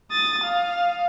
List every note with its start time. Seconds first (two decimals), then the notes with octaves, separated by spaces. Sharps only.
0.11 D#6 A6
0.45 F5